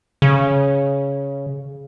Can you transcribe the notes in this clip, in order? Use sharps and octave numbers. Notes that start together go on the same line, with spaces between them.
C#3